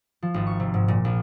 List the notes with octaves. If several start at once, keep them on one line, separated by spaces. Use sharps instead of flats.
F3
G#1
C#6
C3
G#2
A#2
A#1